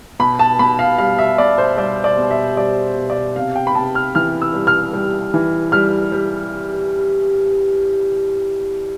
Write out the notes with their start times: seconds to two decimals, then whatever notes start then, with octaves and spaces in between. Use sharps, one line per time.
0.19 B2 B5
0.39 A5
0.59 B2 B5
0.79 F5
0.98 G3 F5
1.19 E5
1.38 B2 D5
1.58 C5
1.77 G3 D5
2.04 D5
2.18 B2
2.31 E5
2.57 G3 D5
2.96 B2
3.10 D5
3.36 C3 F5
3.55 G5
3.67 B5
3.75 C3 A5
3.95 F6
4.15 E3 F6
4.42 E6
4.54 G3
4.67 F6
4.93 G3
5.34 E3
5.72 G3 F6
6.12 G3